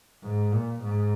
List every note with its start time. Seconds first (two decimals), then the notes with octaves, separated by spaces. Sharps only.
0.24 G#2
0.52 A#2
0.83 G#2